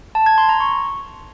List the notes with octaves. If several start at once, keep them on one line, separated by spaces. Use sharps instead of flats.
A5
G#6
C6
A#5
C#6